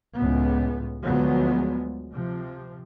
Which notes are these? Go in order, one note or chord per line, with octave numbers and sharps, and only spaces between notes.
C#2 A2 B3
D2 F3 F#3 G#3 B3
C3 F3